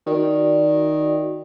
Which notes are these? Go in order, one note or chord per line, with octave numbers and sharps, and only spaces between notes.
D#3 F#4 D5